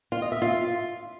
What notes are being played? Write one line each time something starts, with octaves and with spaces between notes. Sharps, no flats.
F4
D#5
E5
F4